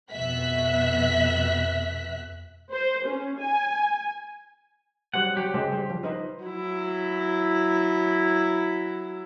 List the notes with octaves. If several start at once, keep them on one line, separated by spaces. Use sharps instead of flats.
F2 B2 E5 F#6 B6
C5
C#4
G#5
F#3 G3 C5 F#5
F#3 G4
C#3 G#3 C5
G3 C5
F3
D#4 B4 C5
F#3 E4